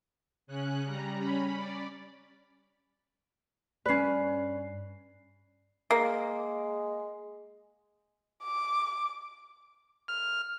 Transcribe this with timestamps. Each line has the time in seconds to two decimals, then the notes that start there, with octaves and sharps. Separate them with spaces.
0.47 C#3 C#4 F#6
0.84 G3 A#5
1.19 C#4 B5
1.57 D5
3.86 G2 C#4 B4 D5 C7
5.91 G#3 A#3
8.43 D6
10.08 F6